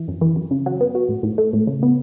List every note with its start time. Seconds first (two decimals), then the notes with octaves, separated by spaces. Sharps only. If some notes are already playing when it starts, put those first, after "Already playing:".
Already playing: E3
0.08 F#2
0.21 E3
0.36 F#2
0.51 C#3
0.66 F#3
0.81 B3
0.95 F#4
1.09 A2
1.23 A2
1.38 A3
1.53 A2
1.67 C#3
1.83 B3